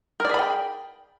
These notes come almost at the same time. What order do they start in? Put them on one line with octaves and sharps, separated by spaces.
A#4 D5 G#4 B5 G5